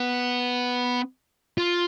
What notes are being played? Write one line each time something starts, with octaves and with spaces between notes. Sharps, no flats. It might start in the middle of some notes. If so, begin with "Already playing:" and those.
Already playing: B3
F4